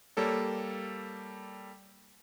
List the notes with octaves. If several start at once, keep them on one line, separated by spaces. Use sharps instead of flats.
G3 A#3 A4 C#5